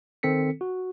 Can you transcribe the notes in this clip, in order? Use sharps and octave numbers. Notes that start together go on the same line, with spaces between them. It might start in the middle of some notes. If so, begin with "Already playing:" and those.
D#3 C4 A4 B6 C#7
F#4